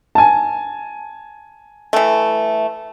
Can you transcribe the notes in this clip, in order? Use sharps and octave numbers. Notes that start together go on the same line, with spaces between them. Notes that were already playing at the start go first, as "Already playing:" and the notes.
G#5 A5
E3 A3